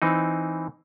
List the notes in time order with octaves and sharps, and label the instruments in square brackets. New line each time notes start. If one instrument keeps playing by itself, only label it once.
[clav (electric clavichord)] E3 C4 D#4